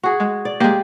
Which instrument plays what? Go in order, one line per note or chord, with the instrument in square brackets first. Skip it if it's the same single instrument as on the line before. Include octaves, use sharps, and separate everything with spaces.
[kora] F#4 G#4
[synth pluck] G#3
[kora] D5
[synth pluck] G#3 A#3 [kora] G4